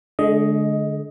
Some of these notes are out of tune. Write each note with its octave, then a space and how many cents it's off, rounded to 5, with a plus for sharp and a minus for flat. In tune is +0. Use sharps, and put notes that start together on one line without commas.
D3 +0 G#3 +40 D#5 +10